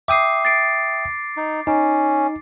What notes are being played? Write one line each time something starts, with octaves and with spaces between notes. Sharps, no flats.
E5 G5 D6 D#6 C7
A6 C7 D7
D#4
C#4 D#4